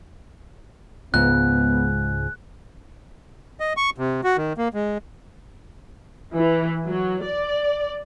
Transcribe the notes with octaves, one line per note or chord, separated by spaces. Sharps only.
C#2 G#2 B3 F#6
D#5
C#6
C3
F#4
D#3
A#3
G#3
E3
F#3
D5